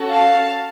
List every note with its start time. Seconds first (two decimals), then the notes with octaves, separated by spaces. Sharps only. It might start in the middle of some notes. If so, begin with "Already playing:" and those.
Already playing: C#4 F#4 A4
0.10 F5 A5